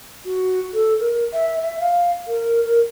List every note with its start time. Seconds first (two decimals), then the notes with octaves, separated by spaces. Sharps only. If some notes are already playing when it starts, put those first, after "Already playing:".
0.25 F#4
0.74 A4
1.00 A#4
1.33 E5
1.61 E5
1.80 F5
2.28 A#4
2.65 A#4